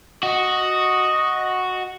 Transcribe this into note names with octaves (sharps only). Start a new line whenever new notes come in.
F#4 D#5